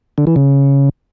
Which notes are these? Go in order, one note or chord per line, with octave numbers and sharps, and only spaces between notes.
D3
E3
C#3